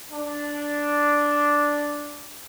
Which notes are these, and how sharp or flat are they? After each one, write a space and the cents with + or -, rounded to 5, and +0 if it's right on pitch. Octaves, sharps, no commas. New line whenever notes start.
D4 -5